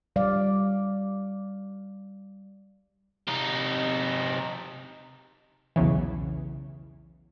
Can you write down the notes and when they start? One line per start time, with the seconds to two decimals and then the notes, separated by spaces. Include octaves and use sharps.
0.16 G3 D5 F5
3.28 C3 D#4
5.76 B1 E2 C#3 E3